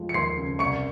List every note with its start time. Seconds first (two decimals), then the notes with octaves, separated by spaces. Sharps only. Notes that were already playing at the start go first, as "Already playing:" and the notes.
Already playing: F2 F3 G#3
0.09 C#7
0.14 D#2 C6 C7
0.38 C#3
0.59 C2 C#6 C#7